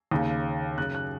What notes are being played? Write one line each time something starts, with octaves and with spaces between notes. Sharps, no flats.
D#2 C#3
F#2 C#3 F#6
F#6